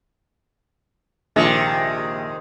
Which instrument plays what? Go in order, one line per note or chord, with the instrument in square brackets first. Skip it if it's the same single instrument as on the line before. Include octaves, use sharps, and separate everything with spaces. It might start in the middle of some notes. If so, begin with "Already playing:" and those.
[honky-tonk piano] A#1 [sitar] C3 D#3 G#3